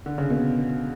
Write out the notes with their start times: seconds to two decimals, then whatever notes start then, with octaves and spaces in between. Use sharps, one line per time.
0.06 D3
0.18 C#3
0.30 B2